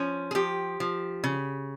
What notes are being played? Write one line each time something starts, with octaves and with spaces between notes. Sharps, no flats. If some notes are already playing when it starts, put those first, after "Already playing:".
Already playing: F3 C#4
G#4
F3 G4
F3
C#3